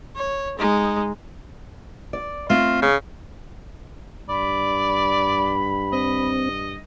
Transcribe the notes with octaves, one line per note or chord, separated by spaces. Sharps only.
C#5
G#3 D#4
D5
A3 C4 F4 E5
C#3
G2 D5 B5
C4 D#5